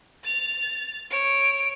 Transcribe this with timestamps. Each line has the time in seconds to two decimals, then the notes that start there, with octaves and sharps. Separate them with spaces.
0.24 A6 F7
1.10 C#5 D7